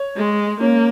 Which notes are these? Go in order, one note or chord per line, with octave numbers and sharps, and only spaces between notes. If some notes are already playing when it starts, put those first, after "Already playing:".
Already playing: C#5
G#3
A#3 C#4